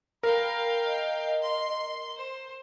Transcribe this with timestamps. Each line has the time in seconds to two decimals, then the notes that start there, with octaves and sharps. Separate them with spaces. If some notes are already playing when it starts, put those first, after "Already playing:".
0.23 A#4 F5 G5 B5
0.85 D#5
1.42 C6
2.16 C5